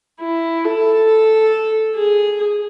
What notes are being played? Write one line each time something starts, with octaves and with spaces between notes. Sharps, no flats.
E4
A4
G#4